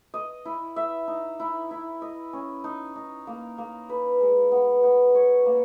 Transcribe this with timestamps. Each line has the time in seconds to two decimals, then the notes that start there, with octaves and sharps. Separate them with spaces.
0.14 D#5
0.45 E4
0.76 E5
1.08 D#4
1.40 E4
1.71 E4
2.02 D#5
2.33 C#4
2.64 D#4
2.95 D#4
3.27 A#3
3.58 A#3
3.89 B4
4.21 G#3
4.52 B3
4.83 B3
5.15 C#5
5.46 A#3